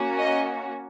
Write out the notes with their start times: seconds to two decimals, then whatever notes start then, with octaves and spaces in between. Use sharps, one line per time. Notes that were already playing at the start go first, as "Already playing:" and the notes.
Already playing: A#3 C#4 F#4
0.19 D#5